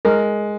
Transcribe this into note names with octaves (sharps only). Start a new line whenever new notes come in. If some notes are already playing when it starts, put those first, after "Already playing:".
G#3 A#4